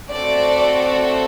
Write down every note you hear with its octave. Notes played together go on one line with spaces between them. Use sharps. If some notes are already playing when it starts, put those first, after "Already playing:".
A3 C4 F#4 A4 D5